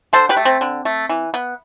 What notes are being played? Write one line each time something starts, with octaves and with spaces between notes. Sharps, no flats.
D3 A4 C5
G4 B4
A3
C4
D3
A3
E3
B3